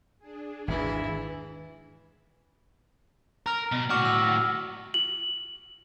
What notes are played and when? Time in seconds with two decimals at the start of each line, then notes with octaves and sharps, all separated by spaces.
0.19 D4 G#4
0.68 G#1 E2 G#2 E3 E4
3.46 A#4 A#5 F6
3.72 B2
3.90 A2 F#4 C#6 D6 F6
4.05 E6
4.94 F#7